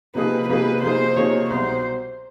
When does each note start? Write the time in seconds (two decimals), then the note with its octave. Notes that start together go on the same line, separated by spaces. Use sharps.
0.15 C3 F3 A#3 D#4 G#4 B4
0.49 C3 F3 A#3 D#4 G#4 B4
0.82 C3 F3 A#3 D#4 G#4 C5
1.16 C3 F3 A#3 D#4 G#4 C#5
1.50 C2 B2 F#3 C5